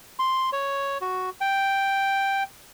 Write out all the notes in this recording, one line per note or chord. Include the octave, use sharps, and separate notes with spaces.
C6
C#5
F#4
G5